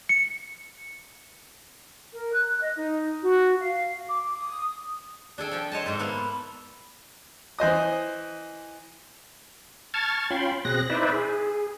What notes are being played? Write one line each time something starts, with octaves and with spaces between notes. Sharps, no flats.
C#7
A#4
F#6
D#5
D#4
F#4
F5
D6
D#6
D4 G#4 A4 G5
F3 G5
C5 C#5 D#5 A5
G#2 A4 C5 E5
A#3 B3
E3 C5 D#5 D#6
A5 C#6 F6 G#6 A6
C#4 F4 G5 B5 C6
B2 C4 G#4 F#6 A#6
D#4 E4 B4 C5 D5 E5
G#4